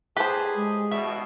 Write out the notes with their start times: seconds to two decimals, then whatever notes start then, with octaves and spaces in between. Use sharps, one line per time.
0.17 A2 G4 G#4 B4 C5 A5
0.56 G#3
0.91 A1 B2 E5